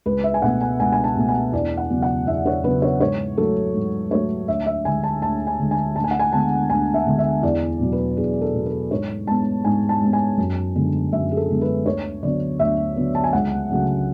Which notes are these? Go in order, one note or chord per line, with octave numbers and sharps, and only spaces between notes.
C#2 B4
E5
G#5
B2 A3 F#5
G#5
C#2 G#5
G#5
A5
B2 A3
G#5
E2 D5
F#5
C#3 F#3 B3
F#5
E2 E5
C#5
C#3 F#3 B3 B4
C#5
G#2 C#5
F#3 A3 A4
G#2
F#3 A3 C#5
D2 E5
E5
D3 G#3 G#5
A5
D2 A5
G#5
D3 G#3
G#5
D2 A5
G#5
F#5
G#5
D3 G#3 B3 A5
D2 G#5
E5
D3 G#3 B3
E5
E2 D5
B2 F#3
B4
E2 G#4
A4
B2 F#3
A4
G#2 C#5
G#3 B3 A5
G#2 G#5
A5
G#3 B3
G#5
F#2
D3 G#3 B3
F#2 E5
G#4
A4
D3 G#3 B3
B4
D2 C#5
D3 F#3 B3 D5
D2 E5
D3 F#3 B3
A5
G#5
C#2 F#5
C#3 F#3 A3